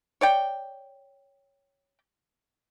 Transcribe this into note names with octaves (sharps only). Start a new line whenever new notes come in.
C#5 D5 G5